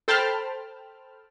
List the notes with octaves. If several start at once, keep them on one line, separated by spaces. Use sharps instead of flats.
A4 C5 G5 A5 B5 F6